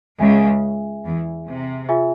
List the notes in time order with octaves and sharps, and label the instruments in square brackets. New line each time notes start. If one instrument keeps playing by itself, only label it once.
[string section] C#2 C#3 [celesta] G#4 E5 G#5
[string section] E2 E3
C3
[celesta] F4 G#4 E5 G#5